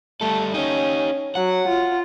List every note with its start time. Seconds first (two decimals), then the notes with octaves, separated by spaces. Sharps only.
0.21 G3 A3 A4
0.54 C#4 D#4 G4
1.35 F#3 F#5
1.68 F4